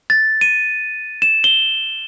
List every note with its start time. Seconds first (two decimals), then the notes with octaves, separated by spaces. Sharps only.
0.10 A6
0.41 D#7
1.22 E7
1.44 G7